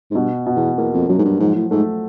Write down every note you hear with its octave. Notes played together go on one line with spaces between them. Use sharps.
G#2
G2 B2
B2
E2
E2 A#3
F2
F#2 F#3
G#2
G2
G#2 F3
A2
G#2 A3